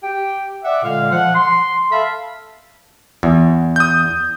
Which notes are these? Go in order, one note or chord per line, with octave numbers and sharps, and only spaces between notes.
G4 G5
D5 E5 F#5
A#2 D3 G#3 F5
F3 F#5
C6
A4 E5 F5 A5 B5
E2
D#6 G6